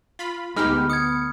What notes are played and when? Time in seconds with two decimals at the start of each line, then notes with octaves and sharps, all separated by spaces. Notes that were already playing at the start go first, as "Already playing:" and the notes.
0.19 F4 B5
0.56 D2 G#3 B3 D#4 G4 B5 F6
0.90 D#6 G#6 C#7